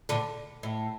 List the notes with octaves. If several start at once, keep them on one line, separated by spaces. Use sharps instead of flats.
A2 D3
A2